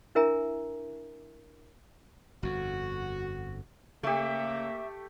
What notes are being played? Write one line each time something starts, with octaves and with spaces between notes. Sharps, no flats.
D4 E4 A#4 E5 G#5 A#5
G1 F2 F#4
C#3 A3 A#3 G4 E5